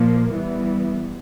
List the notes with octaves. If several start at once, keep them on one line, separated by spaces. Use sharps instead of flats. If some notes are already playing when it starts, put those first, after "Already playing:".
Already playing: A#2 F3 A#3
E3 G3 B3